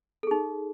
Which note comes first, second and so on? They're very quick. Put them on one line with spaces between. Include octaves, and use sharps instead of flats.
A4 G#4 D#4